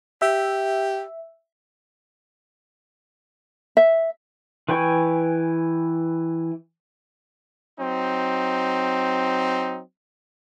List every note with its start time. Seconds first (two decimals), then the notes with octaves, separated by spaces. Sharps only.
0.22 G4 E5
3.77 E5
4.69 E3 B4 G5 G#5 C#6
7.78 F#3 C4 D#4